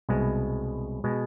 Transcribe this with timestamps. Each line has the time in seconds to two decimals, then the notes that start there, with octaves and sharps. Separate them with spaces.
0.09 C2 B2 G#3
1.04 B2 G#3